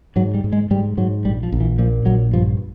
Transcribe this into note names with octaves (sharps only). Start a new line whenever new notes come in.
G#2 F#3
G3
G#2
G#3
G#2 G3
G#2 F#3
A#1 G3
F3
A#1
E3
A#2 F3
A#1 F#3
G2 F3